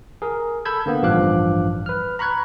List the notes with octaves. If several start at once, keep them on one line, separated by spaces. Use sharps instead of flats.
G#4 A#4
A4 B5 E6 G6 G#6
D3 A#3 B3
A1 G2 F3 F5 D6 F#6
B4 F6
A#5 B5 C#6 F#6 G#6